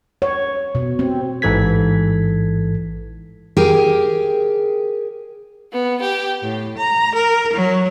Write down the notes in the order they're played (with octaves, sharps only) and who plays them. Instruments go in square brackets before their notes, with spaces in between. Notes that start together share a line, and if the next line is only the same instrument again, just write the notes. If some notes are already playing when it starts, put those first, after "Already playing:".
[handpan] C#5
B2
C4
[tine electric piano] A1 G#2 E3 A4 G#6 B6
[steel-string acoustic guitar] G4 G#4 A#4 G5 G#5
[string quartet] B3
G4
A2
A#5
A#4
F#3